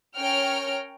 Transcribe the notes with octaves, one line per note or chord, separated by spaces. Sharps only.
C#4 A#4 C#5 G5 F6